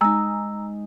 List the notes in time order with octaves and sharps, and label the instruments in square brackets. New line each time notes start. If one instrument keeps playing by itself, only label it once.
[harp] G#3 D#4 [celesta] G#5 A#5 E6